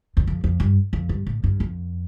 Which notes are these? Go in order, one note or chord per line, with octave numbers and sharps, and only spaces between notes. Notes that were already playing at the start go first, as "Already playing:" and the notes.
E2
F2
F2
G2
F2
G2
A2
G2
F2